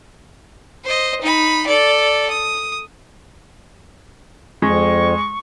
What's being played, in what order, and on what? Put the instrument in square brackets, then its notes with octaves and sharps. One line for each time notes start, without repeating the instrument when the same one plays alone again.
[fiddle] C5 D#5
D#4 B5
A4 D5
D#6
[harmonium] F2 [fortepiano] G#3 [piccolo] C#6